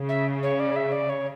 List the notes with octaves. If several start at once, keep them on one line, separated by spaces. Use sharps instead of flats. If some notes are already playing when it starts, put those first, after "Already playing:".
Already playing: C#3
E5
C#5
D5
E5
D5
C#5